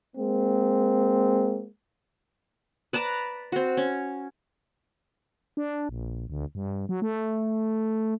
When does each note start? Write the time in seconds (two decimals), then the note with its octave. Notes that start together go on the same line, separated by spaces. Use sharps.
0.17 G#3 A#3 C4
2.93 B4 D5 A5 A#5
3.52 C4 F#4
3.77 C#4
5.57 D4
5.89 A#1
6.30 D2
6.55 G2
6.89 F#3
7.02 A3